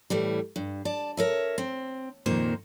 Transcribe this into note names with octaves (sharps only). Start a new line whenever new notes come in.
A2 E3 G3
G2
D5 A5
A#4 C#5 E5
C4
F2 A#2 D#3 A#3 C5